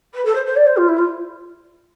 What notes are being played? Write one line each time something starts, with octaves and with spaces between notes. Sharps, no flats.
B4
A4
C5
C5
D5
C5
F4
E4
F4